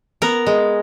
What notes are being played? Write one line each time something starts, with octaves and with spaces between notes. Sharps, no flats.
B3 A#4
G#3